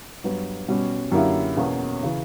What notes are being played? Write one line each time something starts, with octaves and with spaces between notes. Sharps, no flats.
G2 F#3 B3
B2 G3 C#4
F#2 D3 A#3 E4 G4
E2 B2 A#3 C#4 F#4
C#3 E3